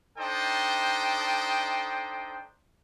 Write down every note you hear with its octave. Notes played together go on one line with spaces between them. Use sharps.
D4 D#4 A4 C5 D#5 G5